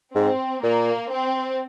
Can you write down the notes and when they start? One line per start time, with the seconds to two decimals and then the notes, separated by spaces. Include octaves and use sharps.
0.15 G#2 C4
0.62 A#2 A#3
1.10 C4